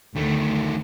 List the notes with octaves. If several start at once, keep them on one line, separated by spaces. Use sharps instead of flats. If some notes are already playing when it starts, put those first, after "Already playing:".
D2 D#3 A3